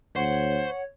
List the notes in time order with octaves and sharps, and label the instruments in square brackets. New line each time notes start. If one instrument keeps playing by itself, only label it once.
[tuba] D2 [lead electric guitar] C5 [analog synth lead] C#5 [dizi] F#5